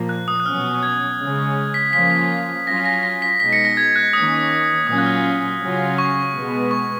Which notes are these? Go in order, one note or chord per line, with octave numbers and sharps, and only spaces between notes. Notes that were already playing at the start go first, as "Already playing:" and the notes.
Already playing: A#2 F3 A#3
F#6
D#6
F#6
B2 F#3 C#4 F6
G#6
C#3 G#3 C#4
B6
F3 A#3 C#4 F4 B6
F#3 C#4 F4 A#6
A#6
A#6
B6
B2 G#3 D#4 B6
A#6 C#7
A#6
G#6
F#6
D#3 A#3 C#4 D#6
A#2 F#3 C#4 F4 D#6
F#6
F6
C#3 F#3 C#4 F4
C#6
B2 G#3 B3
C#6